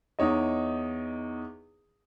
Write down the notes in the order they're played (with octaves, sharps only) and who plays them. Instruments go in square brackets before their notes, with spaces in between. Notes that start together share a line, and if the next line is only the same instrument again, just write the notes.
[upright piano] E2 D#4 C#5 D#5